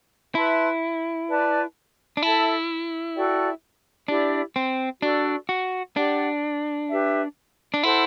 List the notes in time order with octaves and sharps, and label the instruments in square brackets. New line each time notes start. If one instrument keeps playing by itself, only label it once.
[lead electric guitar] E4 [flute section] B4 E5 A5 C6
[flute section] B4 D5 A5
[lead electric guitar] D4
[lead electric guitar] E4 [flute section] A4 E5 A5
[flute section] F#4 A4 D5 G5
[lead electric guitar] D4 [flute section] E4 G4 D5
[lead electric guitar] C4
[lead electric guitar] D4 [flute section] F#4 A4 D5
[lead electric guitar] F#4
[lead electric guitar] D4 [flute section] G4 D5 F#5
[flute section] G4 B4 E5
[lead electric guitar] D4
[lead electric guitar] E4 [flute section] A4 C5 F#5 C6